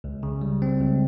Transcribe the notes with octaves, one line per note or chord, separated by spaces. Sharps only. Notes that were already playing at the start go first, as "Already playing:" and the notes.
C#2
C#3
G3
C4
C#2